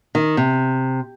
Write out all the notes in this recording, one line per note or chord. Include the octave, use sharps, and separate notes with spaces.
D#3
C3